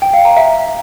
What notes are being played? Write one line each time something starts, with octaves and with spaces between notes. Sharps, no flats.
G5
F5
A#5
E5